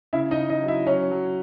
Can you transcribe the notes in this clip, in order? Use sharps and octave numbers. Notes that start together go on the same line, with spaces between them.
C#3 E4 E5
D#4 D#5
C#3
D#4 D#5
F#3
E4 E5
F#3 C#4 C#5
F#3